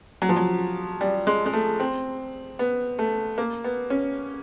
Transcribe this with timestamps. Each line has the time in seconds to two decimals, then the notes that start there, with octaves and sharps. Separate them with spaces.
0.22 F#3
0.29 F3
0.36 F#3
1.01 G3
1.27 G#3
1.46 G#3
1.53 A3
1.80 C4
2.59 B3
2.99 A3
3.38 A#3
3.64 B3
3.90 C#4